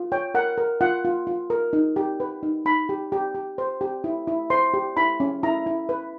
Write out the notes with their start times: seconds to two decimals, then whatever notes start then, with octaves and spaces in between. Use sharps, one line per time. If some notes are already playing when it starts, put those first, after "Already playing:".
Already playing: F4
0.12 C#5 G5
0.35 A#4 F#5
0.58 A#4
0.81 F4 F#5
1.05 F4
1.27 F4
1.50 A#4
1.73 D#4
1.96 G4
2.20 B4
2.43 D#4
2.65 D#4 B5
2.89 G4
3.12 G4
3.35 G4
3.58 C5
3.81 G4
4.04 E4
4.27 E4
4.50 C5 C6
4.74 G4
4.97 E4 B5
5.20 C#4
5.43 E4 A#5
5.66 E4
5.89 B4